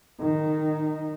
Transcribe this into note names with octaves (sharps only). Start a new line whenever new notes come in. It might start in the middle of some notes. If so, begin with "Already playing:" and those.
D#3 D#4